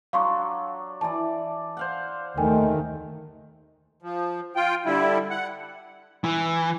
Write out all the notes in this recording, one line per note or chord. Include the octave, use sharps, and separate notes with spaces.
F#3 D4 F5 C6 C#6
E3 D5 A5
C5 F5 F#5
D#2 D#3 A3 A#4 G5 G#5
F3
F4 G5
D3 G3 E4
F#5
E3